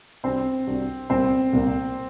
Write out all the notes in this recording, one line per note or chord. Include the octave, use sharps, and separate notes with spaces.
C2 C3 G3 C4 D4 F#4
C2 C3 G3 D4 F#4
C2 A#2 G3 A#3 C4
C2 A#2 G3 A#3